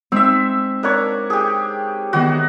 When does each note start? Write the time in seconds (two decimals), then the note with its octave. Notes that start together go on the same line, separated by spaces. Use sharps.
0.12 G#3 C4 D#4 E5 E6
0.83 A#3 D4 C#5
1.30 G4 G#4
2.13 D#3 E3 B3 F#4